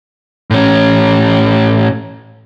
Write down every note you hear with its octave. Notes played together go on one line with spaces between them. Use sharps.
A2 C#4